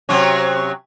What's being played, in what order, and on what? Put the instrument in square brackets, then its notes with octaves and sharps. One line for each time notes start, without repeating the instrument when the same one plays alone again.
[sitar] C3 F#3 C#4